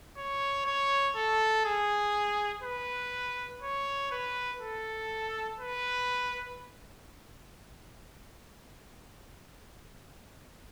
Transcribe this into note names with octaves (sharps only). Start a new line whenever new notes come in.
C#5
C#5
A4
G#4
B4
C#5
B4
A4
B4